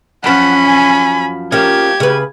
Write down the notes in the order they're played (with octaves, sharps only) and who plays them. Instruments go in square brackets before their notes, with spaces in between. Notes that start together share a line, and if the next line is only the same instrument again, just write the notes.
[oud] F#2 F3 [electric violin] C#4 B5 [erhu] F#5
[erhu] G#5
[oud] F3 A#3 C#4 [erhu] G4 [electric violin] G#6
[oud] C#3 B4